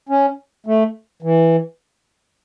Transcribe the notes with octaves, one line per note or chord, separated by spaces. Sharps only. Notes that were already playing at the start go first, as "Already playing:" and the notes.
C#4
A3
E3